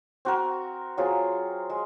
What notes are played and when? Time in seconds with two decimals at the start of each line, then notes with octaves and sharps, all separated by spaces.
0.25 C4 F#4 A#4
0.97 F#3 C4 F4 G#4
1.70 G#3